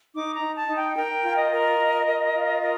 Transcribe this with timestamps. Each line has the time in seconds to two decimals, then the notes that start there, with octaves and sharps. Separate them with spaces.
0.13 D#4 D6
0.33 A#5
0.41 D#4
0.54 A5
0.68 D#4
0.75 G5
0.96 A#4 G5
1.23 F4
1.37 D#5
1.52 A#4
1.78 F4
2.07 A#4
2.34 F4
2.61 A#4 D#5